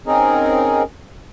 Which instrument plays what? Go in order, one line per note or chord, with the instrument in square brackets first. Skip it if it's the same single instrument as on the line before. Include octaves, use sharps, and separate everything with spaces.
[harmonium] C4 C#4 D#4 G#4 A#4